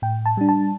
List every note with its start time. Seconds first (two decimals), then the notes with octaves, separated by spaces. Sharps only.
0.02 A2 G5
0.26 A5
0.37 G3 D4
0.49 A5